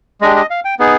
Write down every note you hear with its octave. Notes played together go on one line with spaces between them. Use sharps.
G#3 D4 G4 D#5
D#5
F5
G5
B3 D#4 G#4